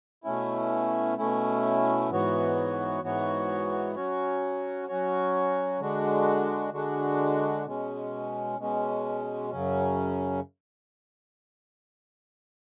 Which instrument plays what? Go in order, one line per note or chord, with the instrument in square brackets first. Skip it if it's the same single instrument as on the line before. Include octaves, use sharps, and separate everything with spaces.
[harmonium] B2 A3 C#4 E4
B2 A3 C#4 E4
G#2 E3 B3 F#4 C#5
G#2 E3 B3 F#4 C#5
F#3 C#4 F#4 C#5
F#3 C#4 F#4 C#5
D3 G#3 D4 F#4
D3 G#3 D4 F#4
B2 G#3 C#4
B2 G#3 C#4
F#2 C#3 F#3 C#4